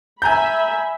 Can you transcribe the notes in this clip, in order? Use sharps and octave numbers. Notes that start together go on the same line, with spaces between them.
E5 G#5 A#5 B5 G6